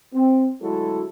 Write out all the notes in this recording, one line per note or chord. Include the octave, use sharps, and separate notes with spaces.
C4
D2 F#3 G#3 E4 F#4 A4